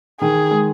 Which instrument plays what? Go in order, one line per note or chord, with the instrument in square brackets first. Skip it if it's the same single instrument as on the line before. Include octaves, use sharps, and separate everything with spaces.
[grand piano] D#3 [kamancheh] G#4
[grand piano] G#3